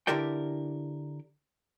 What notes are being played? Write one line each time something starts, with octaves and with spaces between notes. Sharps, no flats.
D3 E4 G4 A#4 D5 G5